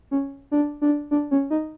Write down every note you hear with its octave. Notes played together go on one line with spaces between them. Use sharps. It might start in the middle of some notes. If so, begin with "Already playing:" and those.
C#4
D4
D4
D4
C#4
D#4